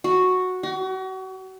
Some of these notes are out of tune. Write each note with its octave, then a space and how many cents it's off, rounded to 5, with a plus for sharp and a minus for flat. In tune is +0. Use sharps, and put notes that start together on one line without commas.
F#4 -5
F#4 +35